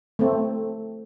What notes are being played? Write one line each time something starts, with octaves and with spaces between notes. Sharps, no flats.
A3 C4